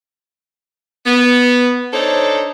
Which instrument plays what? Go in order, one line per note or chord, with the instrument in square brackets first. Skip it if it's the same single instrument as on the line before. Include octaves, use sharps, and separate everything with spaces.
[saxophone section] B3
D4 D#4 A4 C5 C#5